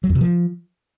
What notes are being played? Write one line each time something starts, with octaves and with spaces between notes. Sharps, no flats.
F#3
F2
C3
F3